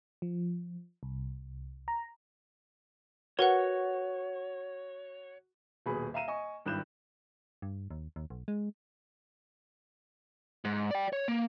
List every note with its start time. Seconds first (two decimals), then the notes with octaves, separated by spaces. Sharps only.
0.22 F3
1.03 C2
1.88 A#5
3.39 F#4 A#4 B4 C#5 F#5
5.86 D#1 B2 G#4 B5
6.14 E5 F5 A#5 D#7 E7
6.28 D#5 G#5 C#6
6.66 G#1 G2 E4 F#6 G6 E7
7.62 G2
7.91 D#2
8.16 D#2
8.30 B1
8.48 G#3
10.65 G#2
10.91 D5 G5
11.13 C#5
11.28 A#3